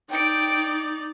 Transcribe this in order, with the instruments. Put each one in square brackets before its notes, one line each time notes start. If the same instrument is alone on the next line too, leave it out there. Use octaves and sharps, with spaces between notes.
[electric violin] D#4 D5 [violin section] G5 D7